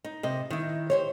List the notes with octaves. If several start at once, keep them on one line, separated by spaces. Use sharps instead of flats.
D#4
C3 D#5
D#3 E4
G4 C5 C#5